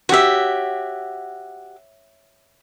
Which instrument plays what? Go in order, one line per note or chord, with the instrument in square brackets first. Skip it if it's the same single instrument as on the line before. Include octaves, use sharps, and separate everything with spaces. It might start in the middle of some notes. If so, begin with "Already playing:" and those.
[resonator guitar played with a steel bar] F#4 G4 [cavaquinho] C#5 E5